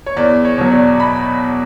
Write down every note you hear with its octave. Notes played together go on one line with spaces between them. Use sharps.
C#5
E2 D5
C#5
B2 F#3
D5
B5